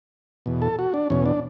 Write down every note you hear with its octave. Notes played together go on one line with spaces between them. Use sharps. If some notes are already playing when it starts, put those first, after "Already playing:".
E2 B2
A4
F#4
D4
E2 B2 C#4
D4